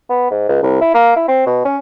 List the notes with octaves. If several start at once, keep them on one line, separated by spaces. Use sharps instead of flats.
B3
G#2
C#2
C2
E4
A#3
E4
C4
B2
C#4